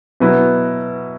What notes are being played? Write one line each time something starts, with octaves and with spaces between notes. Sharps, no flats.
B2 F#3 B3 E4